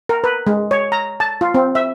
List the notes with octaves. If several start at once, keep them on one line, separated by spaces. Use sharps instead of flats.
A#4
B4
G#3
C#5
A#5
A5
F4
C4
E5